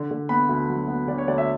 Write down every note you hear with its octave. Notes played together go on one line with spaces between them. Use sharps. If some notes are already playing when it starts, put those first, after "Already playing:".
Already playing: D3
D3
B3 B5
D2
F#3
B3
D3 D5
C#5
D2 D5
E5